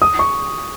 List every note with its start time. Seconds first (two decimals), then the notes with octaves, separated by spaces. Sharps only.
0.02 D#6
0.19 C#6